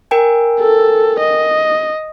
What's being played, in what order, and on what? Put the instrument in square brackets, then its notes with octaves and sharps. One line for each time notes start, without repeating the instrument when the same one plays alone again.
[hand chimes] A#4 G5 G#5
[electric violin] A4
D#5